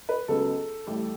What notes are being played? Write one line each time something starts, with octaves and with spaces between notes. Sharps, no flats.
B4
C#2 C#3 F#3 B3 A4
A1 A2 G3